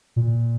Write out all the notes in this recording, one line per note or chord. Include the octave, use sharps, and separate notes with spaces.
A#2